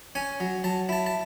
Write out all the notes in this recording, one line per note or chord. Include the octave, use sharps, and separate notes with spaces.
C#4 G#5
F#3
F#3 A5
E4 A5
A5